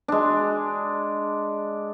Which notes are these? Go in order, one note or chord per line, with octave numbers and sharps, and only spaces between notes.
G#3 D4